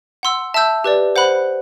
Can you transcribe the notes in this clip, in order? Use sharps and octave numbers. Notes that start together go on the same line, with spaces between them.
F#5 C6 E6
E5 A5 E6 G6
G4 B4 D5
C5 F#5 B5 F#6